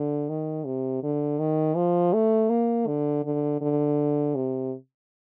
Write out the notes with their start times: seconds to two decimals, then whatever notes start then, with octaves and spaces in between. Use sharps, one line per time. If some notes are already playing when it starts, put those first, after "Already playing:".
Already playing: D3
0.29 D#3
0.65 C3
1.03 D3
1.40 D#3
1.76 F3
2.13 A3
2.50 A#3
2.87 D3
3.24 D3
3.61 D3
4.35 C3